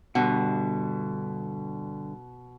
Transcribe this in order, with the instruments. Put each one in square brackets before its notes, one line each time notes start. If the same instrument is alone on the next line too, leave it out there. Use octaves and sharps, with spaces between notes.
[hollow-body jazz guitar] G2 D3 F#5 [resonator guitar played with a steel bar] B2